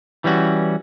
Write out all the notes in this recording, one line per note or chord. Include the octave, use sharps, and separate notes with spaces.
E3 G3 C#4 F#4